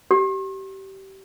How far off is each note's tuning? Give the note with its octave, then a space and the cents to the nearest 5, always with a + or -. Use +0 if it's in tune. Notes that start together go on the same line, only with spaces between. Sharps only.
G4 -25